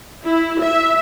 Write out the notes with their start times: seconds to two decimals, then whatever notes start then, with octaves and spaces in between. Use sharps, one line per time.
0.25 E4
0.61 E5